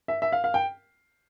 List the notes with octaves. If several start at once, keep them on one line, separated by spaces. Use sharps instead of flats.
E5
E5
F5
F5
G5